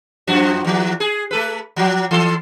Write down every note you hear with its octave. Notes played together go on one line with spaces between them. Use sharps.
F#2 F3 F#4
E2 F3
G#4
A3 A4 B4
F3 F#3
E3 A4